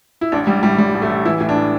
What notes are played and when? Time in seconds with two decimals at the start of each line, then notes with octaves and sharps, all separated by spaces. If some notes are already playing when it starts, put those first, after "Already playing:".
0.21 E4
0.32 A1 D4
0.47 A1 G3
0.63 A2 G3
0.78 A1 G3
0.94 A1
1.02 A3
1.09 A1
1.25 E3 E4
1.41 A2
1.49 D4
1.56 A2